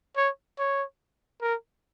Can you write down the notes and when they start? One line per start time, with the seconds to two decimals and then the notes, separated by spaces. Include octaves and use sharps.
0.16 C#5
0.59 C#5
1.42 A#4